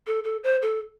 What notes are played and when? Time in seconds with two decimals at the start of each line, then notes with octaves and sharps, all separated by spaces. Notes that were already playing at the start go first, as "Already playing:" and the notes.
0.07 A4
0.24 A4
0.44 C5
0.62 A4